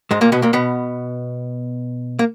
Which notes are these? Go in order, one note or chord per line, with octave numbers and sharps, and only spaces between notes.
G#2 G#3
A#2 A#3
B2 B3
A#2 A#3
B2 B3
A#3